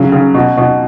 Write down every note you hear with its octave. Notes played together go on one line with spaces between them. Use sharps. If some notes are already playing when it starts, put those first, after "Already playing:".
Already playing: C#3 F#3
C#3
B2
B2